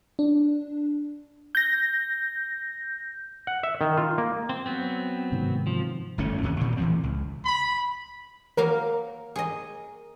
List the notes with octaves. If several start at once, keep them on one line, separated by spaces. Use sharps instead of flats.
D4
G6 A#6
F#5
E5
D#3
F4
A#3
C4
F#3 B3 C4
G#2 C3 D#3
F3
G1 F2 A3 C#4
D#2 C3 C#4
G2 A#2
A2 E3 F3 C4
C#2
B5
F#3 A#3 A#4 F5
G#4 D#5